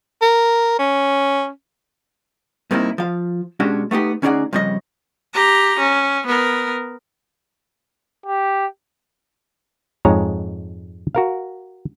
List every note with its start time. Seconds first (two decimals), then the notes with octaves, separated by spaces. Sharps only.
0.22 A#4
0.79 C#4
2.71 G2 C3 A#3 C4 D#4 E4
2.98 F3 F5
3.60 B2 G#3 C#4 D4 F#4 G4
3.91 A3 B3 D#4 G4
4.22 D2 C#4 D#4 G#4 D5 F#5
4.53 F2 C#3 G3 C#5 D#5
5.34 G4 A#5
5.80 C#4
6.27 B3 A#4
8.26 G4
10.05 F2 G#2 G#3 C#5 A#5
11.15 F#4 A#4 F5